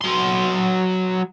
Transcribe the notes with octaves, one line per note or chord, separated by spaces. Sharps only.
F#3 C6